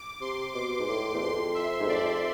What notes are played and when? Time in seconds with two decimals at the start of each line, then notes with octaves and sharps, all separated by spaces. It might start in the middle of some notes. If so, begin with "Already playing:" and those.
Already playing: D6
0.21 C3 C6
0.54 B2 D6
0.80 G#2
0.88 A2 C6
1.15 E2
1.21 F2 C6
1.54 E5
1.80 G#2
1.88 F2 D5